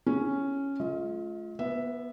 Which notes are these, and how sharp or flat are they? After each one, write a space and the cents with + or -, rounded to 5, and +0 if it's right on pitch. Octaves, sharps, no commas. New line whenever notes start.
C#4 +0 E4 -5 G#4 +0
A3 -45 F4 +0 D#5 +40
B3 -20 B4 +40 E5 +0